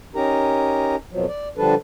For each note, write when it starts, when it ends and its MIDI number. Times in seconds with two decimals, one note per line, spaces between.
0.15 0.96 61
0.15 0.96 63
0.15 0.96 67
0.15 0.96 70
0.15 0.96 82
1.12 1.26 41
1.12 1.26 47
1.12 1.26 53
1.12 1.26 54
1.28 1.48 74
1.58 1.75 50
1.58 1.75 53
1.58 1.75 55
1.58 1.75 62
1.58 1.75 69
1.58 1.75 71